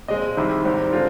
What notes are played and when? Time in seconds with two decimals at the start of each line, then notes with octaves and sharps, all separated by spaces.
0.08 A#2 G#3 C4 D#5
0.37 C2 C3 D#3
0.65 G#2 G3 C4
0.93 D3 G#3 C4 F4